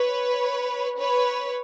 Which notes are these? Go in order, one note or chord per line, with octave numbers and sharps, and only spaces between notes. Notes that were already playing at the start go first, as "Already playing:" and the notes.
Already playing: B4 C#5
B4 C#5